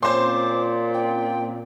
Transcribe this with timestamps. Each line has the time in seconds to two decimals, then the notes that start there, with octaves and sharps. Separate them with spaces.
0.03 A#2 C4 C#4 C5 C6 D6
0.94 G5